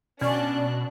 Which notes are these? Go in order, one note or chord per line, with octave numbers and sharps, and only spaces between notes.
B2 C#4 D4 F#4 D5 F#6